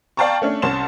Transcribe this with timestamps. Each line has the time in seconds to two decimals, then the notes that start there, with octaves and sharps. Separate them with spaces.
0.17 D5 F5 G5 A5 A#5 C#6
0.42 A3 C#4 D4
0.62 C2 C#4 A5 C6 E7